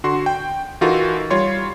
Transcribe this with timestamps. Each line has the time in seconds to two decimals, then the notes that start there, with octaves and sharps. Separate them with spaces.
0.04 D3 F#4 C6
0.26 G5
0.81 E3 D#4 F4 F#4 A4 A#4
1.30 G3 F4 C#5 C6